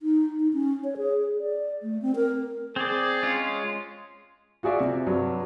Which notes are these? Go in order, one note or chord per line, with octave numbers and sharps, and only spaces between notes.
D#4
D#4
C#4
C#5
G#4
D5
A3
C4
A#4
C4 G#4 D5
G#3 C#4 F4
F4 F#4 G#4 D5 E5
C3
G2 F#3